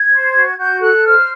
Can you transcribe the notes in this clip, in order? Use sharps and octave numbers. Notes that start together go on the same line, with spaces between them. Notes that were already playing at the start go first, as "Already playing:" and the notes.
Already playing: G#6
C5
F#4
F#4 G6
A4 F#6
C5 F6